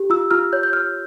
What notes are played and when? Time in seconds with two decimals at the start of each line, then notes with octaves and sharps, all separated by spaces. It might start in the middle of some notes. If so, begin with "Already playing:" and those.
Already playing: G4
0.10 F4 E6
0.31 F4 F6
0.53 C#5 G6
0.63 G6
0.73 C#5 F6